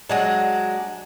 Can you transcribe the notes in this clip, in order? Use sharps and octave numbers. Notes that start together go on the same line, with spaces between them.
F#3 G#3 D4